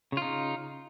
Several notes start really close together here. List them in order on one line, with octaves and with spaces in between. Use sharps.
C#3 F4 D#4